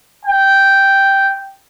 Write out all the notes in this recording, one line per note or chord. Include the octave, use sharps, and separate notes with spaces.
G5